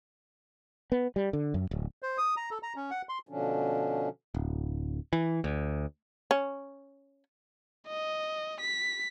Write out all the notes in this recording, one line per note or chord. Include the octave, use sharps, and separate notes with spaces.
B3
G3
D3
F#2
D1
C5
D#6
A#5
A4
A#5
C#4
F#5
C6
B2 D3 F3 C#4 D4
D1
E3
D2
C#4
D#5
B6